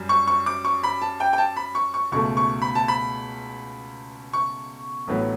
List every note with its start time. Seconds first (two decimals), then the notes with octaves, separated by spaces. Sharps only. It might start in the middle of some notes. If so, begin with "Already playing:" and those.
Already playing: F#2 G3
0.09 C#6
0.27 C#6
0.46 D6
0.65 C#6
0.83 B5
1.02 A5
1.20 G5
1.33 G5
1.38 A5
1.56 B5
1.75 C#6
1.94 C#6
2.12 C#2 B2 A3 C#6
2.37 C#6
2.62 B5
2.75 A5
2.88 B5
4.33 C#6
5.07 A1 A2 F#3 B3